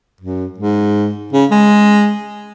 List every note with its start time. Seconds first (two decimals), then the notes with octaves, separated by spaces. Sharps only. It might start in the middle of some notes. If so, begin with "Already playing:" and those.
0.21 F#2
0.58 G#2
1.33 C#3
1.51 G#3